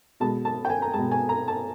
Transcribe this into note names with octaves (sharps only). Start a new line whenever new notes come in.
B2 G#3 A5
A5
G5
G#5
A#5
B2 G#3 A5
G#5
A#5
A5